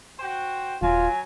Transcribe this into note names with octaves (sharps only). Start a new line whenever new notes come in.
F#4 C5 G5
D#1 F#3 F4 G#5